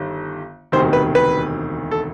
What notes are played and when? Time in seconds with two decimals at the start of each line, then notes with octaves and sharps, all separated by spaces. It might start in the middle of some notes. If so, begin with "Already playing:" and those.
Already playing: G1 D#3 G3
0.72 E1 D2 C3 D#3 C5
0.93 B4
1.15 B4
1.91 A4